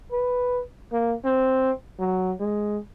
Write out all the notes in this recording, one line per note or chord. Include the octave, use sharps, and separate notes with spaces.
B4
A#3
C4
F#3
G#3